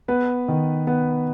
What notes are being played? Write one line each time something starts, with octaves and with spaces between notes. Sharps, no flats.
B3 B4
D#3
B3